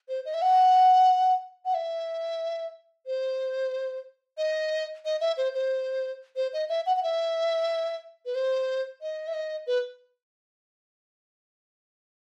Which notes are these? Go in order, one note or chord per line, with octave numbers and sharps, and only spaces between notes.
C5
D#5
E5
F#5
F#5
E5
C5
D#5
D#5
E5
C5
C5
C5
D#5
E5
F#5
F#5
E5
B4
C5
D#5
E5
D#5
B4